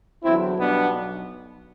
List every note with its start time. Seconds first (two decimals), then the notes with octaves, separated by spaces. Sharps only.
0.24 E2 D3 F#3 C4 E4
0.57 B1 B2 G3 B3 D4
0.90 B1